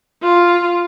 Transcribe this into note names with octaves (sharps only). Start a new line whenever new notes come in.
F4